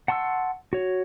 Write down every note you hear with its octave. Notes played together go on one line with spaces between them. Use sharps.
F#5 A5 C6 C#6 E6
F#4 C#5